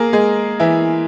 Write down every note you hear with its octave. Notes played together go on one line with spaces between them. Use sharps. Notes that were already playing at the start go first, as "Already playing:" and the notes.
Already playing: A#3 G#4 A#4
G#3 G#4
E3 E4